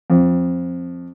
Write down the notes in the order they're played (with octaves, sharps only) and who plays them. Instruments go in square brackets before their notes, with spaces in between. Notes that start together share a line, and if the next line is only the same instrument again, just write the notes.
[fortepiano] F2